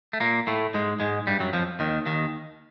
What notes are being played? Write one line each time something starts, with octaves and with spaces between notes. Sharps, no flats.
A3
A#2 A#3
A2 A3
G#2 G#3
G#2 G#3
G2 G3
F#2 F#3
F2 F3
D#2 D#3
D#2 D#3